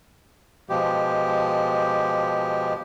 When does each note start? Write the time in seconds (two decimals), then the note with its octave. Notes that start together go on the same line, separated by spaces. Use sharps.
0.70 B2 F3 G#3 G4